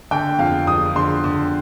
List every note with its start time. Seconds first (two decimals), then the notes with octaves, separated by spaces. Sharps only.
0.11 D3 G5
0.39 F2 F5
0.67 F3 D#6
0.96 D3 C6
1.24 D3